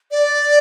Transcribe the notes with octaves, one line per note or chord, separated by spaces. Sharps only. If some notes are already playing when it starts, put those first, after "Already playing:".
D5